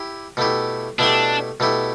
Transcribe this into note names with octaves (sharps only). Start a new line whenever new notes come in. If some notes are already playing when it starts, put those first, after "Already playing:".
Already playing: E4 G4
B2 A3 E4 G4
B2 A3 D4 E4 G4
B2 A3 E4 G4